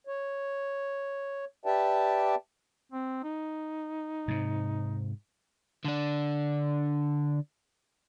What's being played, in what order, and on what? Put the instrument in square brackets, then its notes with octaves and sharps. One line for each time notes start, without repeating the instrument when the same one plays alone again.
[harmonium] C#5
G4 B4 D5 E5 G5 A5
[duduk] C4
D#4
[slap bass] G#2 C3
[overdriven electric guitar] D3 D4